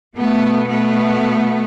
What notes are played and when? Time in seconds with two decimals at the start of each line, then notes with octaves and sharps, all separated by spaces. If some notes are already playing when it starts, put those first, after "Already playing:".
0.15 B2 A3 B3
0.69 A3 B3